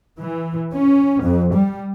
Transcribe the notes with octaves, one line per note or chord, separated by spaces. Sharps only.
E3
C#4
F2
G3